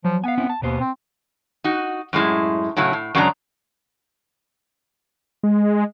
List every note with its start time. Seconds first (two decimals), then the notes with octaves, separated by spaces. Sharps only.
0.04 F3 F#3
0.24 B3 F5 G#5
0.38 C4 C#4 E4
0.50 A5
0.62 D#2 B2 B3 C5
0.80 C4
1.64 D#4 F#4
2.13 F#2 A2 G#3 E4
2.77 A2 C#3 F#3 E4
2.93 A2
3.15 F#2 C#3 F#3 G#3 D4 A#5
5.43 G#3